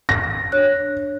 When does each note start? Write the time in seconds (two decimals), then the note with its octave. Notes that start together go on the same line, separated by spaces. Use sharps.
0.09 A#6
0.52 D4 C#5 F#6